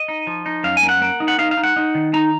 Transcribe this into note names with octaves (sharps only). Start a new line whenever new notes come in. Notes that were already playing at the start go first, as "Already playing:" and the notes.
Already playing: D#5
D#4
F3
D#4
F#2 F5
G#5
A#3
F#5
A#3
D#4
F#5
D#4 F5
F5
D#4
F#5
D#4
D#3
D#4 A#5